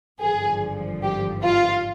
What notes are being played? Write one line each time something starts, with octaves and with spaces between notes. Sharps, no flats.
G#1 G2 D3 F3 G#4
G4
F4